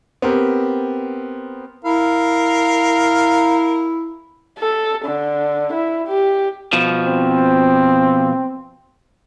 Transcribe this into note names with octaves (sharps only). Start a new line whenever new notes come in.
B3 C4 G4 A#4
E4 A#4 F5
A4
D3
E4
G4
B2 F3
C4